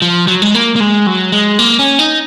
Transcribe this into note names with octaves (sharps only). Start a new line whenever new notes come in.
F3
F#3
G#3
A#3
A#3
G#3
F#3
G#3
A#3
C#4
D#4